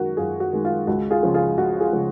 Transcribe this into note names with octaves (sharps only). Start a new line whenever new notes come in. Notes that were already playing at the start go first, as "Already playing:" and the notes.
Already playing: F#2 D#3 G#3 F#4 A#4
F#2 F4 G#4
F#4
D#3 G#3
F4
C#2 F#4
F4 G#4
C#3 F3 G#3
F4 G#4
C#2 F#4
F4 G#4
C#3 F3 G#3